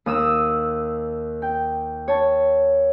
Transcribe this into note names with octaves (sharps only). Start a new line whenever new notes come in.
D#2 D#6 E6
G5
C#5 A5